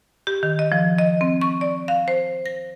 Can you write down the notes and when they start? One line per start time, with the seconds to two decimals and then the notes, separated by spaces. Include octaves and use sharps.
0.27 G4
0.43 D#3
0.59 D#5
0.72 F3
0.99 D#5
1.21 C4
1.41 C#6
1.61 D5
1.88 F5
2.08 C5
2.46 A#6